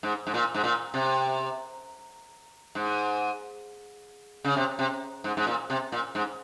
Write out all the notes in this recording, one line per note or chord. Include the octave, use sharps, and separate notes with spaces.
G#2
G#2
A#2
G#2
A#2
C3
G#2
C#3
C3
C3
G#2
G#2
A#2
C3
A#2
G#2